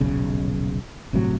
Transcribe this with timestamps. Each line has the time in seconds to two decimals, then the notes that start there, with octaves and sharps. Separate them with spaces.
0.01 D#1 B1 C#3
1.13 G1 A2 C3 F#3